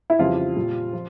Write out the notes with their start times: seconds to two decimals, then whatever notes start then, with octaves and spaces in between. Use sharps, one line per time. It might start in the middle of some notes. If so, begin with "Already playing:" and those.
0.10 E4
0.19 F2 C#3 E3 G3 F4
0.56 A#2 G3
0.93 F3